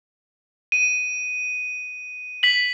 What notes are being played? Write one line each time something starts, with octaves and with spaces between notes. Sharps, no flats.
D#7
B6 F#7